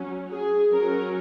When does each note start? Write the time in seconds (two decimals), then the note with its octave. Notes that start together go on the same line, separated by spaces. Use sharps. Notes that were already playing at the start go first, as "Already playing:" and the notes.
Already playing: F#3 C#4
0.32 G#4
0.72 F#3 C#4 A#4